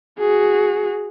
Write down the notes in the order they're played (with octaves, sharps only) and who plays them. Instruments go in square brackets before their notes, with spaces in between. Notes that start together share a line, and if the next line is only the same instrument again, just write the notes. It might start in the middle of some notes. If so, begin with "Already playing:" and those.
[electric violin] F#4 G#4